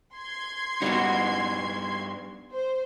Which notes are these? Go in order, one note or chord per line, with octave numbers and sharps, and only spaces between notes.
C6 G#6 C7
G2 G3 B3 D#4 F#4
C5